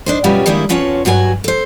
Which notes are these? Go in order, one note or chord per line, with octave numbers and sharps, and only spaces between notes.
D4 D#4 C5
B2 F#3 G3 C#4 F4
D#3 G3 G#3 A#3 D4 E4
E2 C#4 F4 F#4 C#5 A5
G2 F#3 F#4 A4 G#5
A4 C5